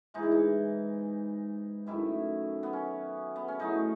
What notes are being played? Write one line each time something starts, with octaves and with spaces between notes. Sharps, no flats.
G#2 E3 G#3 D#4
E4
D#4
F#2 D#3 A3 E4
B3
C#4
B3
C#4
A2 F#3 A3 D#4